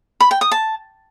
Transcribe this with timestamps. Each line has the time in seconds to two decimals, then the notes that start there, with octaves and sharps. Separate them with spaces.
0.20 B5
0.31 G5
0.41 D#6
0.51 A5